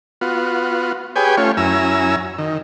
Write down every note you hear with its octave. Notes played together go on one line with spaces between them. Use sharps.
B3 F4 F#4
G4 G#4 B4 C#5 G5 G#5
A3 C#4 F4 C#5
F#2 C#4 E4 G#5 A#5 E6
D#3